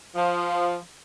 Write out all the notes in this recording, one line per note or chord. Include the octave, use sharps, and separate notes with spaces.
F3